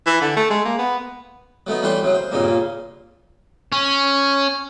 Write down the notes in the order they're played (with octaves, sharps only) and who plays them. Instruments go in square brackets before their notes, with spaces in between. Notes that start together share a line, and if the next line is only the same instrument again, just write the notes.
[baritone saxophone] E3
D3
A3
G#3
A#3
B3
[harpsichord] F#3 A3 B3 D#4
E3 G3 A3 B4 C#5 C6
F#2 C#3 F#3
C5
G2 A#2 C#3 C4 D#4
A#2 C#3
[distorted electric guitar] C#4